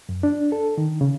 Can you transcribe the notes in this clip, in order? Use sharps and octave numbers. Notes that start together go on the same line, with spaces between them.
F#2
D4
A4
D#3
C#3